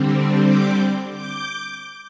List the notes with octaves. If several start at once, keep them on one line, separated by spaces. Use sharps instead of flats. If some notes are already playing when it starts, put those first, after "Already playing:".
Already playing: D3 G3 C4
D6 G6
D6 G6